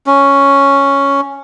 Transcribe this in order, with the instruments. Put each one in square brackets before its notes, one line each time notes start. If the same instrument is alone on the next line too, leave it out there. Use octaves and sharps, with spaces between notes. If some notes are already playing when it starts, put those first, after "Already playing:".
[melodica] C#4